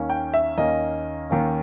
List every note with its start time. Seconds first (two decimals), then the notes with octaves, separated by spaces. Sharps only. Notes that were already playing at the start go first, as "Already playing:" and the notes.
Already playing: D#2 D#3 A#3 C#4
0.10 G5
0.34 E5
0.57 D#2 D#3 A#3 C#4 D#5
1.30 D#2 D#3 A#3 C#4